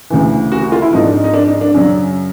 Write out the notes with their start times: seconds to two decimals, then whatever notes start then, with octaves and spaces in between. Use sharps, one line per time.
0.10 D2 C#3 E3
0.52 F#4
0.62 F#4
0.72 F4
0.82 E4
0.93 G#2 F3 D#4
1.04 D4
1.14 D#4
1.24 D#4
1.34 D4
1.47 D#4
1.61 D4
1.74 F#2 C#3 F#3